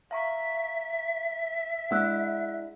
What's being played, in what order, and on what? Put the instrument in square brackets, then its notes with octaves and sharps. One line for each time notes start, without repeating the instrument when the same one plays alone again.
[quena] E5 [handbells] F5 A#5 C#6
[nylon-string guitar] G#3 D4 E4 [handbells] F#5 E6 F#6